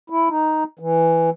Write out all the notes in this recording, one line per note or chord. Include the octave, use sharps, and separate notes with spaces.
E4
D#4
E3